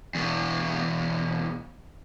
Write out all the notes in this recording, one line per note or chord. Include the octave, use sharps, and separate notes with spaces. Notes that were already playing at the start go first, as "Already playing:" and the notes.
E2 B2